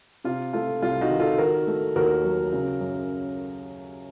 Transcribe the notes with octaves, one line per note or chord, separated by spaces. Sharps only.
C3 F4
A3 F4
C2 F4
D#4 F#4
D#3
F4 A4
D#3 F#4 A#4
A3
D#2 F#4 A#4
F#3
C#3
F#2